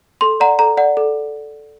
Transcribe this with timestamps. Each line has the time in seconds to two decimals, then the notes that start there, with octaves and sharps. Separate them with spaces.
0.21 A4 C6
0.40 D5 F#5 A#5
0.59 A4 A#5
0.77 D5 F#5
0.97 A4